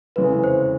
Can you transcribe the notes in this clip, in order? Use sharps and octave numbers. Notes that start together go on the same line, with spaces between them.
F1 E2 C#3 E3 G#3 B4
C5